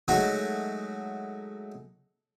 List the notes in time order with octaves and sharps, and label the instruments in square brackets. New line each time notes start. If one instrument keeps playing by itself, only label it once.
[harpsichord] F#3 G#3 A3 D#4 F#4